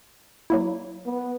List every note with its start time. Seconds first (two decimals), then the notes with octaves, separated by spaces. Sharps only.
0.50 F#3 A#3 E4
1.06 B3